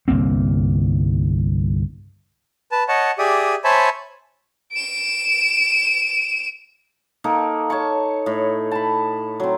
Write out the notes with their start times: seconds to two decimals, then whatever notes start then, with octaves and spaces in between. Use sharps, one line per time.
0.08 G1 C2 A#3 C4
2.72 B4 A5
2.88 C#5 D#5 F#5 A5
3.18 G4 G#4 D5 E5 D#6
3.64 C5 C#5 E5 G#5 A5 B5
4.73 D7 E7
7.24 A#3 D#4 A4
7.70 C#5 A5 C#6
8.26 A2
8.71 A5 B5
9.40 F#3 C4